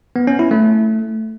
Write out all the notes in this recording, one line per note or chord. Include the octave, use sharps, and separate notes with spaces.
B3
C#4
E4
A3